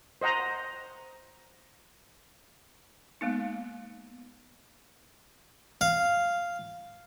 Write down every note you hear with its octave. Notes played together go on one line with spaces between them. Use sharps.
C5 D#5 F#5 A#5
G#3 A#3 B3 D#4
F5